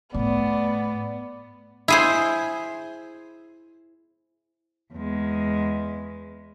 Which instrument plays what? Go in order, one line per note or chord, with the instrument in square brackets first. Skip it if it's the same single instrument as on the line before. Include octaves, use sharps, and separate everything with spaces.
[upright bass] A2 [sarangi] B3 [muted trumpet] D5
[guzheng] E4 G#4 C5
[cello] E2 G#3